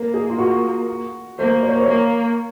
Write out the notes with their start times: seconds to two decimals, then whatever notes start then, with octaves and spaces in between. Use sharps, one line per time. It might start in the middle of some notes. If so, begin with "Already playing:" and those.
Already playing: A#3 A#4
0.14 G#4
0.30 F4
0.38 F#4
1.39 A#3 C5
1.63 C#5
1.71 C5
1.80 C#5
1.88 A#3